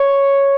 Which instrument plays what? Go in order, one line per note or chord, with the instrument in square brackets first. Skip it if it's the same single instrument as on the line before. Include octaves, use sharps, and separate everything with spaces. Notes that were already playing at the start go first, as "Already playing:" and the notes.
Already playing: [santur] C#5